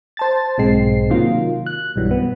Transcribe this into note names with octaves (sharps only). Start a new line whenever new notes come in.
C5 A5 A6
B1 G#2 G#3 C4 C7
C3 D#3 F#3 A#3 F4
F#6
B1 G2 E3 F#3 G3
B3